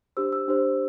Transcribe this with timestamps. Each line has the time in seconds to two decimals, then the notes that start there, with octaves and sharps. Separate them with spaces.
0.17 D4 G4 C5 E6
0.32 E6
0.48 D4 G4 C5